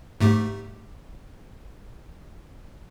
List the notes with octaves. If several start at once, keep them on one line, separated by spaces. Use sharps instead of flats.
G#2 A3 G4